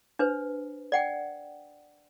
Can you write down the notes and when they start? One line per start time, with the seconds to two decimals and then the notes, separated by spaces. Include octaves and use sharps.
0.19 D4 B4 C5
0.92 D5 F#5 G5